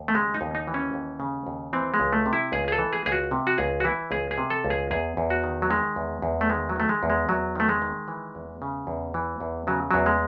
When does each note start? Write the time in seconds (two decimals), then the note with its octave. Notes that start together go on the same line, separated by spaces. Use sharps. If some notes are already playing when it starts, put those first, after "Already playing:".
Already playing: D#2
0.08 A3
0.15 C#3 G#3
0.34 D#4
0.41 D#2
0.55 D#4
0.67 E3
0.74 C#4
0.94 D#2
1.20 C#3
1.47 D#2
1.73 E3 C4
1.94 G#3
2.00 C#2
2.13 A3
2.26 C3
2.33 E4
2.52 C#2 G#4
2.68 G#4
2.72 A4
2.78 E3
2.93 G#4
3.06 C#2 G#4
3.12 F#4
3.31 C3
3.47 F#4
3.58 C#2 G#4
3.80 F#4
3.84 E3 E4
4.11 C#2 G#4
4.31 G#4
4.38 C3
4.50 A4
4.65 C#2
4.70 G#4
4.91 E2 G#4
5.17 E2
5.30 F#4
5.44 D#3
5.62 F#3
5.70 D#3 G#3
5.96 E2
6.22 E2
6.41 A3
6.50 D#3 G#3
6.69 F#3
6.76 D#3 A3
6.89 G#3
7.03 E2
7.10 G#3
7.29 E2 F#3
7.55 D#3 A3
7.69 G#3
7.82 D#3
8.08 E3
8.35 E2
8.62 C#3
8.87 E2
9.14 E3
9.40 E2
9.67 C#3 F#3
9.91 E2 F#3
10.06 G#3